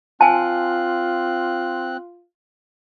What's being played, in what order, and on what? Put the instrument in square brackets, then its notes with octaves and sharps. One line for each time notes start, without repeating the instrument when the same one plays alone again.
[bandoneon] C4 F#6 [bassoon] F4 [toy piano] G#5 A5